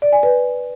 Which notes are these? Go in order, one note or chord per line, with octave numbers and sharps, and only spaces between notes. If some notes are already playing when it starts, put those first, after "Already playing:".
D5
G#5
B4